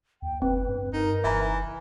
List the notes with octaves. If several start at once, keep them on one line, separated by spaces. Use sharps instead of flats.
D#2 G5
F#1 C4 B4
G2
D#4 A#4
F#1 E3 E5 A#5